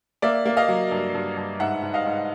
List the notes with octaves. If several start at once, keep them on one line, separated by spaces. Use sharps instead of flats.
A#3 D5 E5
A#3
D#5 F5
F#3
G2
G2
G2
G#2 E5 F#5
G#2
D#5 F5
G#2